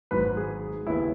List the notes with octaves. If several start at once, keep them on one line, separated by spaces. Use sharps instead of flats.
G#1 G#2 F#3 B4
G#4
D#2 C#3 G#3 B3 E4